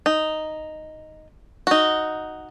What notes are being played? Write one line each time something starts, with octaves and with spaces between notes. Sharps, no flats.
D#4
D#4 F#4